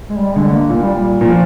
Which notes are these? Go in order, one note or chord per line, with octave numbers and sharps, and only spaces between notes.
G#3
G3
D3 G#3
A#3
A#2
G3
G3
A#2 F3